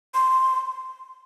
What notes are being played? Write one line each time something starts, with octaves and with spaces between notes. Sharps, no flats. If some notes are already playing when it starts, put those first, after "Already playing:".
C6